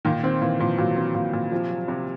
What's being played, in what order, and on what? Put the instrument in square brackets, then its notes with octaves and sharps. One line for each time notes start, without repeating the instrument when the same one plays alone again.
[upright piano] A#2 [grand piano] D#3
[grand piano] D#3 [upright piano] C4
[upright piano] A#2 [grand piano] E3
[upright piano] A#2 [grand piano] F3
[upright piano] A#2 [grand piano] F#3
[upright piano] C4
A#2
A#2
[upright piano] C3 [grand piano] F3
[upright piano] F#3
C3